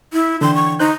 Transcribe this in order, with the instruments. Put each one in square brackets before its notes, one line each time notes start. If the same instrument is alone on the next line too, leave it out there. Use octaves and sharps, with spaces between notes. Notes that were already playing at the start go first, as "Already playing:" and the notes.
[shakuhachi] E4
[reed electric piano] D3 E3 G5 [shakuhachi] C6
[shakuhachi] C#6
[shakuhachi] D#4 [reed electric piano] C5 F#6 G6